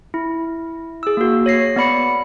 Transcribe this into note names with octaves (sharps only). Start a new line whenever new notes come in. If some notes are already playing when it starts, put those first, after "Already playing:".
E4
G#4 E6
A#3 F#4
C#5 A#6 C7
B3 D5 B5 C#7